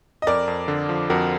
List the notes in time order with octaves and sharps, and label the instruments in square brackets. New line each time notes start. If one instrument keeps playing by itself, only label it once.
[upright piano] D#5
[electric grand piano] F2 [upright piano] A#4 D5
[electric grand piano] F2
D3
F3
[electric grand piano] F2 [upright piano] F#4 A#4